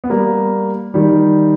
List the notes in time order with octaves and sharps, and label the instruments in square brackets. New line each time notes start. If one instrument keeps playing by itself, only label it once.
[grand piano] B3
G3 A#3
D#3 G3